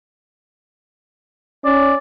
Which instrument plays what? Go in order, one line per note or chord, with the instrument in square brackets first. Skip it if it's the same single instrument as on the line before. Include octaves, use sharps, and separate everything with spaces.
[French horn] C#4 [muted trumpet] D5